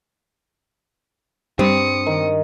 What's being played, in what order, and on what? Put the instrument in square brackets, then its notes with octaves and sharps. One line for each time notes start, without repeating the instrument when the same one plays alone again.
[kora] G2 [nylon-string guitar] C4 [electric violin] D#6 C#7
[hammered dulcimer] D#3